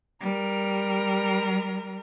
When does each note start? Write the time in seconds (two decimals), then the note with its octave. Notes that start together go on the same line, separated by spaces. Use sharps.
0.21 G3 A#4